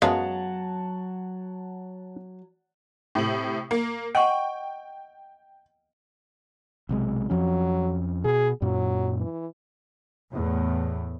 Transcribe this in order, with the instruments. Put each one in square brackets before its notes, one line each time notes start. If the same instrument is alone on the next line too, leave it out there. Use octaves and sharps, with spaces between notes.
[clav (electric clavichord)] F#2 G#3 B3 [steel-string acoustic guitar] F#3 [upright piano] C#5 F#5 A5 [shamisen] F5
[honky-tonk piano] A2 C3 F#7
A#3
[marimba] D#5 F#5 C#6 [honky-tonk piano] G5
[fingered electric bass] B1 C3 G#3
[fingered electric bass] F2 F3 C#4 [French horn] F#3
[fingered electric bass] B2 [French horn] G#4
[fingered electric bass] F#2 A#2 [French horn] F#3
[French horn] E3
[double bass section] E2 A2